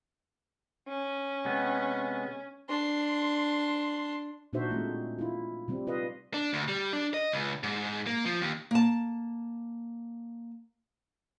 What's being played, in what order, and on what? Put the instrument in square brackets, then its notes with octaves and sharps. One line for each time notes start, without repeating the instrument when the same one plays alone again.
[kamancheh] C#4
[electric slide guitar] C3 G#3 B3
[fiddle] D4 C6
[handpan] A#2 D4 D#4 F#4 C5 E5
G#3 A3 C4
E4 F4
C3 G3 C4
F4 B4 D#5 F5
[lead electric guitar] D4
D2
G3
D4
D#5
C#2
G#2
A#3
F3
D#2
[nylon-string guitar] A#3 A5